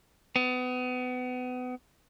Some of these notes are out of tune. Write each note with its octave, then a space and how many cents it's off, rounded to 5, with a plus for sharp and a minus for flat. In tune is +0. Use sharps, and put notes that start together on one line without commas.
B3 +30